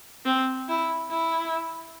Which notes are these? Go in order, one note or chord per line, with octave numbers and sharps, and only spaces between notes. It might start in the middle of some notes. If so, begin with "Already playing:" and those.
C4
E4
E4